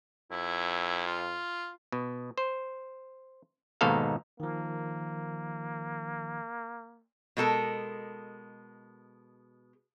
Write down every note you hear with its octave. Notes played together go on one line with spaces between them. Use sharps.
F2 E4
F4
B2
C5
D#2 G#2 B2 D#4 A4 F5
D#3 F3 A#3
B2 G#3 A4 A#4